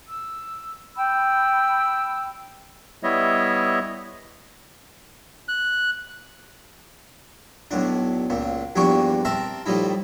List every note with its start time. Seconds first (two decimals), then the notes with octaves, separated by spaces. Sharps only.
0.06 E6
0.95 G5 B5 E6
3.03 G3 B3 E4 C#5 D#5 E5
5.48 F#6
7.71 B1 A2 D4
8.30 C#2 A#2
8.76 E2 G2 F3 A#3 G4 C#6
9.25 C4 A#4 E5 A5
9.66 A2 F3 G3 D#4 E4